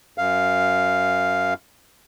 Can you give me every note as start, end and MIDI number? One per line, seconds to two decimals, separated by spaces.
0.18 1.54 42
0.18 1.54 77